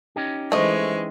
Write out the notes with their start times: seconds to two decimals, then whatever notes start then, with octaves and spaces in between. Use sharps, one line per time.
0.16 C#4 D#4 G4
0.52 E3 G#3 A3 C5 D#5 C#6